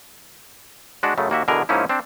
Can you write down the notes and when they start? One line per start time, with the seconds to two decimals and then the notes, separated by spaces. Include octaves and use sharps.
1.03 G#3 D4 F#4
1.18 F#2 C#3 A3
1.30 D#2 A#3 F#4 E5
1.48 B2 D3 E3 G#4 A#4
1.69 G#2 F3 A#3 C#4 D#4 E4
1.89 C4 D4